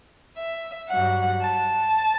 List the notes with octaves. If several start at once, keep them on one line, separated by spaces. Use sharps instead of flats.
E5
G2 F#3 F#5
A5